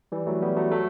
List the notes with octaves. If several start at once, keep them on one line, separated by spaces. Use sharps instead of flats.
E3 G3
F#3 A3
G3 B3
F#3 A3
F#3 A3